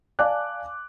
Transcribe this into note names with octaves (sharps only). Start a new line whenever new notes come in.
D5 F5 G#5 A5 D6 F#6